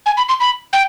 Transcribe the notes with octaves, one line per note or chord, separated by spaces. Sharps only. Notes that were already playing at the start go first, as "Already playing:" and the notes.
G#5
B5
C6
B5
G5